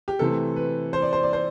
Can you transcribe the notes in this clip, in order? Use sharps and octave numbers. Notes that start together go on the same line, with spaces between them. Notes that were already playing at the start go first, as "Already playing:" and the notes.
G4
C3 E3 A3 C4 A4
B4
C5
D5
C5
D5
C5